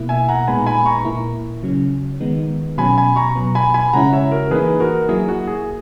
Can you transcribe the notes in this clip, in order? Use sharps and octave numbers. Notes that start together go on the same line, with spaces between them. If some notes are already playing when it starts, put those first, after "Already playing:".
Already playing: B2 A#3 E4
E5 G#5
F#5 A#5
A#2 G#3 B3 D#4 G#5 B5
G#5 B5
A#5 C#6
A#2 A#3 E4
C#3 F#3 C#4
D#3 G#3 B3 D#4
B2 F#3 C#4 G#5 B5
G#5 B5
A#5 C#6
B2 F#3 B3
G#5 B5
G#5 B5
C#3 G#3 C#4 E4 F#5 A#5
C#5 E5
F#4 A#4
E3 A#3 D#4 G#4 B4
F#4 A#4
F#3 A#3 E4 G#4
F#4
G#4